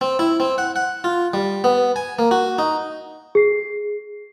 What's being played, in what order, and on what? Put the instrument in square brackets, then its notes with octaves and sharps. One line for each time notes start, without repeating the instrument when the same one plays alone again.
[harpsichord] C4
E4
C4
F#5
F#5
F4
G3
B3
G#5
A#3
F#4
D#4
[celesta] G#4 C7